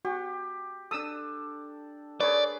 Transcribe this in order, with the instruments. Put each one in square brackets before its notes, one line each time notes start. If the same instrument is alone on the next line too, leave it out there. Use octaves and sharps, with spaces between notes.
[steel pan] F#4 [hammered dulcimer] G4
[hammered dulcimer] D4 A4 [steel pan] D#6 E6
[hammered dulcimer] G#4 B4 [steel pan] A#4 C#5 [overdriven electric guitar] D5